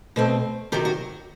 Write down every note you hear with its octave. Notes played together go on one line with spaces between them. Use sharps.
B2 A3 C4
C3 D#3 F#3 G4
F#4